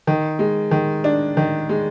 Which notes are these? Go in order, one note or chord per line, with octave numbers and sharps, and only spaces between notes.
D#3
G#3
D#3
D4
D#3
G#3